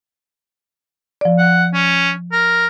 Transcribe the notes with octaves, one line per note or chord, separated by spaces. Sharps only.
F3 D5
F#5
C#4
A#4